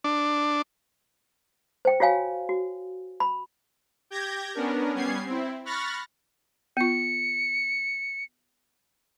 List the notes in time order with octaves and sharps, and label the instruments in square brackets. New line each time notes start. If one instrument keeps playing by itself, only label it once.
[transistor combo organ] D4
[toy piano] C5 G5
F4 F#4 C#5 F5 G#5
F#4
B5
[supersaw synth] G4 G6 G#6 A#6
B3 C#4 D4 A#4
G3 B3 C#4 G#6 C7
C4 E4
B5 C#6 F6 F#6 A6 A#6
[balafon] B3 F4 [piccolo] C#7